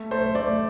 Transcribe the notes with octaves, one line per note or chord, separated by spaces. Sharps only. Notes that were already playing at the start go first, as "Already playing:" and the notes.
Already playing: A3
A3 C5
A3 D5